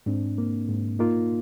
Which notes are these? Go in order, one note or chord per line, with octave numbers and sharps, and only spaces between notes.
G#2 C4 D4
A#3
G#2
A#3 D#4 F4